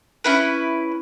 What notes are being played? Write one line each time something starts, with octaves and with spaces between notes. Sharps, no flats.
C#4 E4 B4